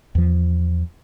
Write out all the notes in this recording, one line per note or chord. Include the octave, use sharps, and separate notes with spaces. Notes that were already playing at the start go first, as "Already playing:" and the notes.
E2 F3